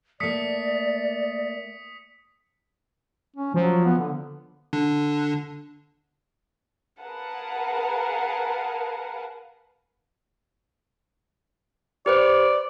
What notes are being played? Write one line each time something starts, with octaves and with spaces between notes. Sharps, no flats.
A3 A#3 D5 D#6 B6 C#7
C#4
F3 F#3
B3
D3
D3 D4
G#4 A#4 B4 F5 F#5 A5
G4 B4 C5 D5